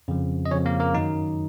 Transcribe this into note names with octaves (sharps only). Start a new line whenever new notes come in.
F2 C#3 F3
D#5
F2 C#3 F3 C#4 C#5
A#3 A#4
A#3 A#4
F#2 D#3 F#3 D#4